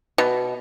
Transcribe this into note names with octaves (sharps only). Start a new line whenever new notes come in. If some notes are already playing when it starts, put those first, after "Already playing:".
B2